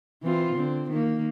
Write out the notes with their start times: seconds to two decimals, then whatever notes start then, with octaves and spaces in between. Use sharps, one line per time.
0.23 E3 C4 F4
0.55 D3 C4
0.89 D#3 A#3